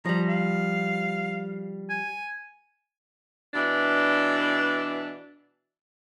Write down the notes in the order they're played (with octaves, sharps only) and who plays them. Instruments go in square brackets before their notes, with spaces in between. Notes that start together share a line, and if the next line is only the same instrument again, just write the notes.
[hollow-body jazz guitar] F3 G3 [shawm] A#5
[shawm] F5
G#5
[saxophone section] B2 E3 D4